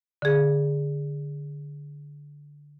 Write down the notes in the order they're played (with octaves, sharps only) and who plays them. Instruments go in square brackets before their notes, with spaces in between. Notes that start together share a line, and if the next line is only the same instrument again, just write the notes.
[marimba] D3 G#4